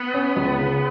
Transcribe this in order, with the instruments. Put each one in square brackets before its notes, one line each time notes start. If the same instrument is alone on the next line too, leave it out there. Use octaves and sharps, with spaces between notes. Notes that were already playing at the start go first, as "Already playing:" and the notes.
Already playing: [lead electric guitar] B3
[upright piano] C#4
C#2
C#3